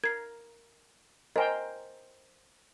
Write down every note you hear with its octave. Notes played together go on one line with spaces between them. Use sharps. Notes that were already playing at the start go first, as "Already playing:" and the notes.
A#4 G#6 C7
A#4 C5 D#5 G5 G#5